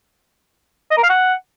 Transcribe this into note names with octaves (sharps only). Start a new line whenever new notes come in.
D#5
A#4
F5
F#5